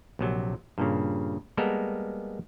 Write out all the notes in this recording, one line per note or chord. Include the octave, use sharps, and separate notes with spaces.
A#1 C3 F#3
G2 A#2 C#3
G3 G#3 A#3 B3 A4 A#4